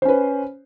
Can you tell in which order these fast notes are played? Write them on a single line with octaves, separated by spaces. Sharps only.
C5 C#4 B4